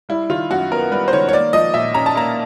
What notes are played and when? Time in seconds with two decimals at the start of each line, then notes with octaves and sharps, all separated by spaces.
0.09 G3 E4
0.29 D#3 F4
0.51 F#2 F#4
0.72 B3 A#4
0.91 G3 B4
1.08 C5
1.13 D#3 C#5
1.29 C#5
1.33 A#3 D5
1.53 F3 D#5
1.74 A#2 E5
1.94 C#4 A#5
2.06 A5
2.15 A#3 A#5